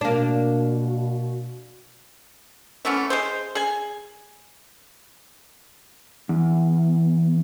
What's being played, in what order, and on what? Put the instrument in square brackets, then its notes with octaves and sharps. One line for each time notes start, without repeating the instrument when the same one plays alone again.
[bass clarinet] B2 [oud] A#3 D4
[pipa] E3 A3 B3 C#4
G#3 G#4 C5
G#4 G#5
[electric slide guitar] E2